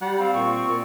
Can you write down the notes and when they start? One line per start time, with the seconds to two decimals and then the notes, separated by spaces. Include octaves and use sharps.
0.02 G3 F#5
0.20 C4 F5
0.34 A#2 C#6
0.68 A#2